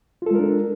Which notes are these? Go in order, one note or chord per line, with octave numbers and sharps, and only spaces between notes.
G#3 D4 F4 A4 A#4